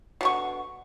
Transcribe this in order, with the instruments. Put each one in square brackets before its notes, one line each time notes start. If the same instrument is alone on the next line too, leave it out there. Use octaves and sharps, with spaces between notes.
[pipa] B2 D3 C#6